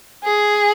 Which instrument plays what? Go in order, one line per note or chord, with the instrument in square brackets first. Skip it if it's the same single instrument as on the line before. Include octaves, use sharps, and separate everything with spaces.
[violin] G#4